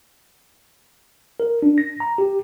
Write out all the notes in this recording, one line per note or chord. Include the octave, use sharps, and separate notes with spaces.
A#4
D4
A#6
A#5
G4